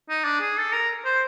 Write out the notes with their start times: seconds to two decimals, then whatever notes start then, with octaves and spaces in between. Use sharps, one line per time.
0.09 D#4
0.24 D4
0.41 G#4
0.58 A4
0.73 A#4
1.05 C5